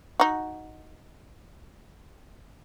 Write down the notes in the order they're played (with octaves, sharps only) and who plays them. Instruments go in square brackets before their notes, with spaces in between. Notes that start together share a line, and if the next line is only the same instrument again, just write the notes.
[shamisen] D#4 F#4